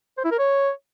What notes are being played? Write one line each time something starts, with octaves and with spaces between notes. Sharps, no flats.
C5
E4
A#4
C#5